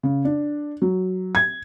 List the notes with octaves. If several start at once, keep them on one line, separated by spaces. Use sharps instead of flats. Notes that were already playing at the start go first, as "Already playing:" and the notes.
C#3
D4
F#3
G#6